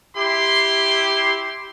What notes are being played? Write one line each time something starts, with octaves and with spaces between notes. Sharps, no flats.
E4 G4 C6